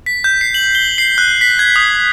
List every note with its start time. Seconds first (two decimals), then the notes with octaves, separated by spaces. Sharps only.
0.06 B6
0.24 G6
0.41 C7
0.54 F#7
0.75 G7
0.98 C7
1.18 F#6
1.41 B6
1.59 G#6
1.76 D#6